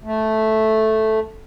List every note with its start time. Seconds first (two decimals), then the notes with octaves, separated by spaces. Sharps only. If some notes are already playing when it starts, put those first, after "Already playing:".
0.04 A3